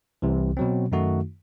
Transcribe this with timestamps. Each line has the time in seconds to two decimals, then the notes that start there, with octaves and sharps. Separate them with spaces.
0.22 C2 C3 E3
0.57 B2 F#3 C4
0.92 F#2 D#3 A3 D#4 F#4